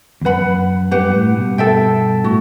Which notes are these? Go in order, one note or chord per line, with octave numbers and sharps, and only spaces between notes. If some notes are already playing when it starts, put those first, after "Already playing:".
E2
F#2 B4 F#5 B5
G2 G4 B4 F#5
A2
G2 B2
A4 E5 G5
A2 F#4